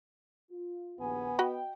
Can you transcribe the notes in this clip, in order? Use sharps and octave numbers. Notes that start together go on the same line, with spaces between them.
F4
A#1 D#2 B3 G#5
F#4 D#5 G5 B5